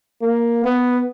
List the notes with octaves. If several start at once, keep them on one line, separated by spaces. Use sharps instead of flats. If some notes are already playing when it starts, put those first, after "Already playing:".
A#3
B3